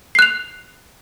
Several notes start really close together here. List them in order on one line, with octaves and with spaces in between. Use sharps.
C7 F#6 F7